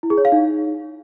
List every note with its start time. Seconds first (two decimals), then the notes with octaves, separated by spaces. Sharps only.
0.03 E4
0.10 G#4
0.18 C#5
0.25 F5
0.32 D#4